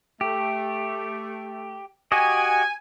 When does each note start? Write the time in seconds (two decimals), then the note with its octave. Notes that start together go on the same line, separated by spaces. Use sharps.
0.21 A3 G4
2.12 F#4 G4 D#5 G#5